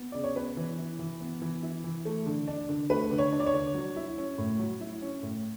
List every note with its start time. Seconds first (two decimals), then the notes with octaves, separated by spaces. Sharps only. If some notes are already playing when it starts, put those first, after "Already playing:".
Already playing: B3
0.12 C#3 D5
0.24 C#5
0.36 B3 B4
0.57 E3
0.78 E4
0.99 E3
1.20 B3
1.42 E3
1.63 E4
1.84 E3
2.05 A3
2.26 D3
2.47 D4
2.69 D3
2.90 A3 B4
3.11 D3
3.18 C#5
3.32 D4
3.40 D5
3.46 C#5
3.54 D3
3.74 F#3
3.96 E4
4.18 C#4
4.38 A2
4.59 F#3
4.81 E4
5.02 C#4
5.23 A2